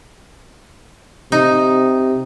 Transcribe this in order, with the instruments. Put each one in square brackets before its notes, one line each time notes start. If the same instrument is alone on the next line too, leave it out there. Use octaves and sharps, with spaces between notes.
[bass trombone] C3 [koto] D#4